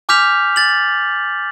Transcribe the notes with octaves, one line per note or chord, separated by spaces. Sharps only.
G#5 D6 F6 G6 B6 F7
A6 F#7